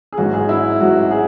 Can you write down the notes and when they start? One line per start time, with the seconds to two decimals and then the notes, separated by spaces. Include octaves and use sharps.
0.13 G#4
0.18 A1 G#2 F#3 F#4
0.34 G#4
0.49 E4
0.80 A1 G#2 F#3 F#4
1.11 G#4